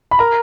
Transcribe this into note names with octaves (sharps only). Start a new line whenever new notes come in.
B5
A#4 A#5